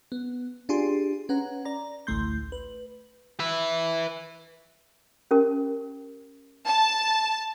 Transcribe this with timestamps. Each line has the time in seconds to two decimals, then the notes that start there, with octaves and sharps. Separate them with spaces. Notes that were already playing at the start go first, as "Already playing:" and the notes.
0.12 B3
0.69 D4 F4 G4 G#4 G#5 C6
1.29 C#4 B4 F#5 A#5
1.65 D5 A#5
2.07 A1 D2 A3 C6 G6
2.52 B4
3.40 B4 E5
5.31 C#4 G4 A#4
6.67 A5